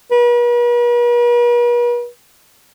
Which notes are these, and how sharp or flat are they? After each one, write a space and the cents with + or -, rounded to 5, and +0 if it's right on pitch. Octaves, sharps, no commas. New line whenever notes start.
B4 -45